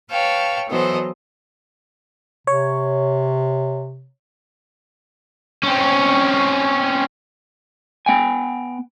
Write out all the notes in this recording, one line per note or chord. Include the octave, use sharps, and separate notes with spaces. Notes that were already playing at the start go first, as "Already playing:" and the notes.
B4 C#5 F5 G5 A5 C#6
E3 F#3 B3 A4 C5 D#5
C3 C#5
C4 C#4
B3 G5 G#5